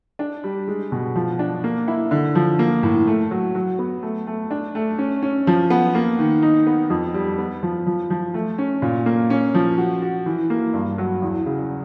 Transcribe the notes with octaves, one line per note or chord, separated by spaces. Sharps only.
D4
G3
G#3
B2
F3
D4
A#3
E4
D3
F3
A#3
A2
A3
F#3
F#3
B3
A3
A3
D4
A3
C#4
C#4
F3
B3
A#3
D#3
D#4
B3
F2
G3
B3
F3
F3
F3
A3
C#4
A#2
A#3
C#4
F3
F#4
F#4
E3
A#3
G2
F#3
E2
C#3